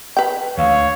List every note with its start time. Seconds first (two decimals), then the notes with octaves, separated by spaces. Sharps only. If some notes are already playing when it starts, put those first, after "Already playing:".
0.17 B4 G5
0.58 D2 C#5 F5